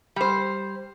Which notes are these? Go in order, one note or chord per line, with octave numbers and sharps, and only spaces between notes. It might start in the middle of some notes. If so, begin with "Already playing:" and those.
G3 C5